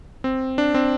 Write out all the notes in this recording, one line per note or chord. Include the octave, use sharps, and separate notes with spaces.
C4
D4
C4